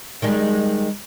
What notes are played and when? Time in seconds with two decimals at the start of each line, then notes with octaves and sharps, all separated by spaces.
0.22 D#3 G3 G#3